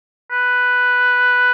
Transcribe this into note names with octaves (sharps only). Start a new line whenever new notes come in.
B4